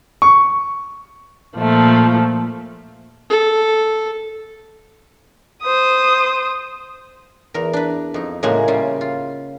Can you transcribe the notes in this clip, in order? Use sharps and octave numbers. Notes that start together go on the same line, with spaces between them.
C#6
A#2 F3 A3
A4
C5 D#6
E2 A#4
D4 B4
F2 D#4
A2 C#3 G#3 A#3 F#4 G#5
C#3 G3 F4
F4